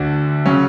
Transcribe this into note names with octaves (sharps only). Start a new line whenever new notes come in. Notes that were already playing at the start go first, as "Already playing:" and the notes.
Already playing: D2 D3 D4 F#4
C#3 F#3 C#4